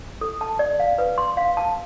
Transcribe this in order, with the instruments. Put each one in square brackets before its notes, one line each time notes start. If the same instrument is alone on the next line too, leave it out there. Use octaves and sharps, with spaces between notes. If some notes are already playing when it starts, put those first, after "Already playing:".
[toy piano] A4
A5
D5
F5
B4
C6
F5
A5